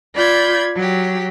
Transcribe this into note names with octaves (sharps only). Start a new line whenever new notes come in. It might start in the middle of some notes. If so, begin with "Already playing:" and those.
F4 D5 B5 G6 G#6
F#3 G4